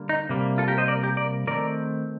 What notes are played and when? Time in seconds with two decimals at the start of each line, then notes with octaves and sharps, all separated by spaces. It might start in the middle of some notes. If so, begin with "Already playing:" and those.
Already playing: D3 G3 A#3
0.09 D#4
0.29 C3 G3 A#3
0.58 F4 A4
0.68 G4 A#4
0.78 C5 D#5
0.88 A#4 D5
1.03 G4 A#4
1.17 A#4 D5
1.47 D#3 A3 C4 A#4 D5